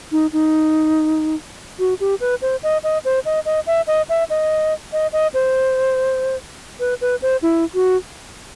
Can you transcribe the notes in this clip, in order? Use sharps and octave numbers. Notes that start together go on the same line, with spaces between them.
D#4
D#4
F#4
G4
B4
C5
D#5
D#5
C5
D#5
D#5
E5
D#5
E5
D#5
D#5
D#5
C5
B4
B4
C5
E4
F#4